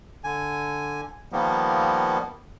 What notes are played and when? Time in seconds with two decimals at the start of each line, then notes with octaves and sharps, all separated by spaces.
0.24 D3 G#5
1.32 D#3 F3 G3 A#3 B3